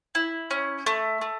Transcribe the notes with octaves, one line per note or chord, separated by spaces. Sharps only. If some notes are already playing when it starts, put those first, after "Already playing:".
E4
C#4
A3
A3